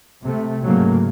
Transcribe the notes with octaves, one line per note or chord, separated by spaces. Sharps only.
C3 A3
G#2 C#3 F#3 A3 A#3